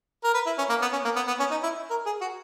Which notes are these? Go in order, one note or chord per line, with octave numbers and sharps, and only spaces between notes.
A#4
B4
E4
C#4
A#3
B3
C#4
A#3
B3
B3
C#4
D#4
E4
A#4
G#4
F#4